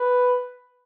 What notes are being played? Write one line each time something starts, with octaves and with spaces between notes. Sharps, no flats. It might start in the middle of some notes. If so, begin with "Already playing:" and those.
Already playing: B4